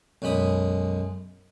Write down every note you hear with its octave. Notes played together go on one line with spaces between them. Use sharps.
B1 F#2 G#3 B5 D#6